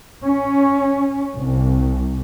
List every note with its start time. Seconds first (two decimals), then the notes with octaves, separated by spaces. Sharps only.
0.23 C#4
1.35 C2